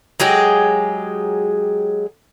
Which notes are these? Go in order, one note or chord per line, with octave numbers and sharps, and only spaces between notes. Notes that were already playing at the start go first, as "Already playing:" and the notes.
F#3 G#3 G4 G#4